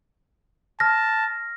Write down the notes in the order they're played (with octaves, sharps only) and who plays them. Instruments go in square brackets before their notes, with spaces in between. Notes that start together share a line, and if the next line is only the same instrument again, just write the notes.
[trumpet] A5 [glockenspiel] F6 A#6